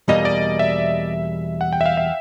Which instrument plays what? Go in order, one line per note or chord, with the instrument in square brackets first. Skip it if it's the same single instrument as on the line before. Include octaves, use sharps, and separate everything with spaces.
[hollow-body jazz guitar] E2 B2 G3 A#3 [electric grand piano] D#5
[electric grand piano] D5
E5
F#5
G5
E5
F5
E5